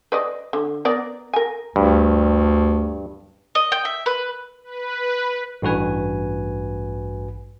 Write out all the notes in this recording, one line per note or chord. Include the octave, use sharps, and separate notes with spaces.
B4 D5 D#5
D3
B3 A#4 D5
A#4 G#5
D2 G2
D#5
G5
E5
B4
B4
A1 G2 F#4 B4 G#5